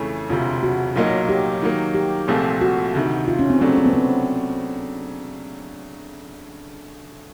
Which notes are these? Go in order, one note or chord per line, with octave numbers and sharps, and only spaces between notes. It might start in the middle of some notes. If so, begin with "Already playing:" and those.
Already playing: F2 C#3 E3 A3 C#4
E1 D2 C3 F4
F#4
B1 A#2 F#3 A#3 D#4
G4
D#3 F#3 A#3
G4
C2 A#2 F3 A3 C4
F#4
D2 C3 D#3
F4
C#4
C4
C#3 F#3 A3 C4 D4
C#4
C4
B3
C4